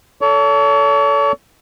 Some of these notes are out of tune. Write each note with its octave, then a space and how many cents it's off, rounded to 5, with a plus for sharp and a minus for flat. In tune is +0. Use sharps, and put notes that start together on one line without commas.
A4 +5 C#5 +40